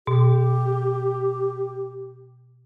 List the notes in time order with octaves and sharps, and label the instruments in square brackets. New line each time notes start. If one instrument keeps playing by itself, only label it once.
[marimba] B2 [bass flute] G4